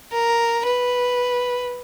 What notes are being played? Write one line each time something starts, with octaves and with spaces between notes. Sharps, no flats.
A#4
B4